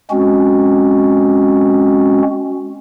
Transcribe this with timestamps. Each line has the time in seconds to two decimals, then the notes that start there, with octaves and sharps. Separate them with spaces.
0.11 G#3 C4 C#4 F#4